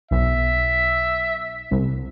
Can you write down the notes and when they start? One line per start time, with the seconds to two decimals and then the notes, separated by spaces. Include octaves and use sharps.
0.11 B1 E5
1.71 C2